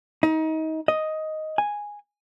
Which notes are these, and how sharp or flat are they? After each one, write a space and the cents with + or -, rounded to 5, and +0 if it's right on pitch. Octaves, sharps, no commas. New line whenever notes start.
D#4 +30
D#5 +5
G#5 -5